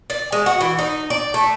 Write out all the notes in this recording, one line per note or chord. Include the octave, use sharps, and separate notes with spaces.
D5
G#3
F#4
E3
D#4
D5
A3